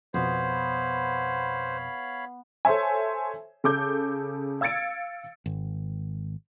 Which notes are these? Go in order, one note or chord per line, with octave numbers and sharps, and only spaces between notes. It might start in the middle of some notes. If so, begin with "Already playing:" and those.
F2 B2 B3 C5 C#5 F5 B5
A4 C5 C#5 E5 G#5
C#3 A4 D6 G6
F5 E6 G#6 A6 C#7 D7
G#1